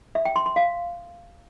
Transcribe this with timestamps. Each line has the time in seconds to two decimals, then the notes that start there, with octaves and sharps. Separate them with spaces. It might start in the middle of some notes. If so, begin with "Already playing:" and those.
0.15 E5
0.25 G5
0.36 C6
0.46 C6
0.56 F5